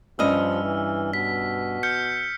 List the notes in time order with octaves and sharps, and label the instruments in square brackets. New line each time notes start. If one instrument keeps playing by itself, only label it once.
[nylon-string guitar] G2 C#4 D#5 [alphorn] F3 [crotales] E6 F6
[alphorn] E3
[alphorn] B2 [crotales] B6
[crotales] F6 G6 C#7